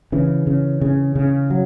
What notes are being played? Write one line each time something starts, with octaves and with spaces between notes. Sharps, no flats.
C#3 E3
C#3
C#3
C#3
F#3